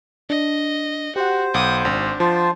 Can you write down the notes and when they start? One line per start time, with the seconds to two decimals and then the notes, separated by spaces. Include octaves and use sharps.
0.30 D4 D#5
1.16 F#4 G4 C5 F#5
1.54 B1 F#5 D6 D#6
1.85 G#1 D4
2.20 F3 F4 C5 A5